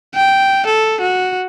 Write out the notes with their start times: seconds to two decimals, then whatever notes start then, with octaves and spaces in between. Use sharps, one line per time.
0.15 G5
0.66 A4
1.01 F#4